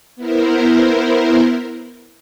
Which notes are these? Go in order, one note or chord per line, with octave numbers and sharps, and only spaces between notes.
B3 E4 A#4 C5